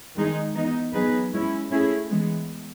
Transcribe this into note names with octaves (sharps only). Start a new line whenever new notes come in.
D#3 G#3 D#4 G#4
E3 B3 D#4
F#3 B3 D#4 G#4 B4
G#3 C#4 E4
A3 C#4 E4 G#4
E3 G#3 B3